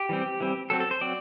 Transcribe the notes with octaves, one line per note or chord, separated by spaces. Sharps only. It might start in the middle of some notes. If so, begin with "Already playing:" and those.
Already playing: G4
E3 G3 C4
E3 G3 C4
F#3 C4 A4
A4
C5
F#3 C4 D5